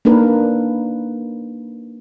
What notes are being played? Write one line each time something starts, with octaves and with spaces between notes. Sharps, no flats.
A#3 D4 D#4 A#4 B4